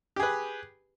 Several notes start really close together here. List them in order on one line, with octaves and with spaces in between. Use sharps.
G4 G#4 B4